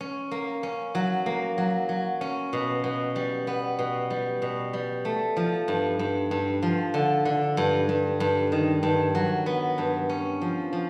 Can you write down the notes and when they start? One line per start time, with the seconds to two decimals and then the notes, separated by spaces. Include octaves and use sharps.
0.01 C#4
0.31 A#3
0.63 C#4
0.95 F#3
1.26 A#3
1.58 F#3
1.89 F#3
2.21 C#4
2.53 B2
2.84 B2
3.16 G3
3.47 B3
3.79 B2
4.10 G3
4.42 B2
4.73 G3
5.05 A3
5.37 F3
5.68 G2
5.99 G2
6.31 G2
6.63 F3
6.94 D3
7.25 D3
7.57 G2
7.89 G2
8.20 G2
8.52 D#3
8.83 G2
9.15 F#3
9.46 B3
9.78 G2
10.09 C#4
10.42 F3
10.73 F3